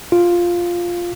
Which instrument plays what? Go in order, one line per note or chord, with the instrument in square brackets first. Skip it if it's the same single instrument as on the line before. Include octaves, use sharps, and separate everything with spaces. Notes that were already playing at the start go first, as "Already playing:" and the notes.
[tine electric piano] F4